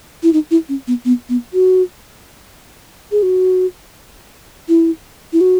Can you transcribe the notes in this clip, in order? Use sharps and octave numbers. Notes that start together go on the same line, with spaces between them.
E4
D#4
E4
C#4
B3
B3
B3
F#4
G#4
F#4
E4
E4
F#4